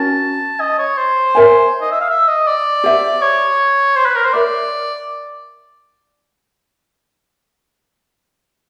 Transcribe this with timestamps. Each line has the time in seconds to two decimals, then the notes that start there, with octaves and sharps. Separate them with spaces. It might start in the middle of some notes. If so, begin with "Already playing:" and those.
Already playing: C#4 F#4 A#4 A5
0.60 D#5
0.79 C#5
0.98 C5
1.35 A#4 C#5 E5 G#5
1.82 D#5
1.91 E5
2.00 F5
2.10 E5
2.28 D#5
2.47 D5
2.84 G4 C5 E5
3.21 C#5
3.96 C5
4.06 B4
4.15 A#4
4.24 C5
4.33 A#4 C#5 D5 E5